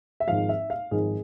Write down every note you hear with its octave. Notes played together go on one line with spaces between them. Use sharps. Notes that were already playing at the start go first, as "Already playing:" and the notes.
E5
G#1 G#2 F3 F5
E5
F5
G#1 G#2 F3 G#4